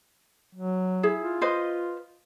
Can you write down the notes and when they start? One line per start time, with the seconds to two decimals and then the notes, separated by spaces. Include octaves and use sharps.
0.55 F#3
1.03 E4 G#4
1.19 F4
1.41 B4 C5 D#5